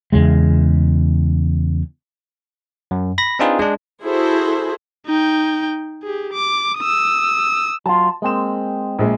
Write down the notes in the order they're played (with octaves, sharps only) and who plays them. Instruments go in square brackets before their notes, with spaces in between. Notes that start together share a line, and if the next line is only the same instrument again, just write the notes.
[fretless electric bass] E2 C#3 G#3
[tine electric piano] F#2
B5 A#6
C4 D4 D#4 F4 G#4 B4
G#3 D4
[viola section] E4 F#4 G#4 A4 C5
[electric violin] D#4 G5
G4 G#4
D6
D#6 E6
[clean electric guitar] F#3 F4 [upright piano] A5
[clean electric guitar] G#3 C4 [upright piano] A#3 E7
[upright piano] A#1 G#3